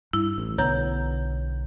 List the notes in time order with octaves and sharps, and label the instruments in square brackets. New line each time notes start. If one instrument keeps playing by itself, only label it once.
[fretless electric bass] G2 [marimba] E4
[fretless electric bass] A1
[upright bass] B1 [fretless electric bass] D3 B3 [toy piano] C#5 [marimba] A#5